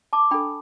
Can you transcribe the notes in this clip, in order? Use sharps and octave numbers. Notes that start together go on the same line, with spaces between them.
A5 D6
D4 A4 G5 B5